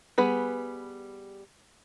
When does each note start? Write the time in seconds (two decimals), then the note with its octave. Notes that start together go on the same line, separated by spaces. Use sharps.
0.18 G3 B3 G#4 B4